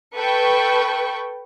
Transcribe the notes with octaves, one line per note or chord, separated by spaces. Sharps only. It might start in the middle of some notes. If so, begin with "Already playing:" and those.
A4 B4 G5 C#6